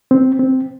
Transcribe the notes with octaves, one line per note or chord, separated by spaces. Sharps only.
C4
C4